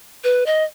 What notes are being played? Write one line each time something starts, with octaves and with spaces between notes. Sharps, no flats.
B4
D#5